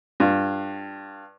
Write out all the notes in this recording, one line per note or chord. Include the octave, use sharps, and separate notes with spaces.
G2 F4